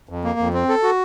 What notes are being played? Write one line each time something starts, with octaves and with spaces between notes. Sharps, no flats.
F2
A#3
F2
C4
A4
F#4